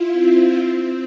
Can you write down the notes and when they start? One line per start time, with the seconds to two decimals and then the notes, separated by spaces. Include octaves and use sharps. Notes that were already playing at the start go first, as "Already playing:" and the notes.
Already playing: E4 F4
0.12 C4
0.54 C4